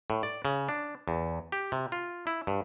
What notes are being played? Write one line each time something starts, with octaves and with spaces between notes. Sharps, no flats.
A2
D5
C#3
D4
E2
G4
C3
F4
E4
G2